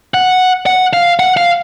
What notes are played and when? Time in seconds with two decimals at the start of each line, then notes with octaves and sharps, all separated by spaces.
0.14 F#5
0.66 F#5
0.93 F5
1.19 F#5
1.37 F5